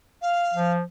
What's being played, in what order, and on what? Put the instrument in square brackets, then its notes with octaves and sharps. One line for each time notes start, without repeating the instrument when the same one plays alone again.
[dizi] F5
[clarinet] F3